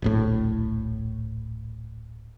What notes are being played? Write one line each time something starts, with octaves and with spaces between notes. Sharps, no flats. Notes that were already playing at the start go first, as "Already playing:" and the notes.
D1 A#1 A2